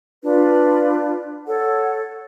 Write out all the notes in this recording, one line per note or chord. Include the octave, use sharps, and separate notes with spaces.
D4 F4 B4
A4 C#5 F#5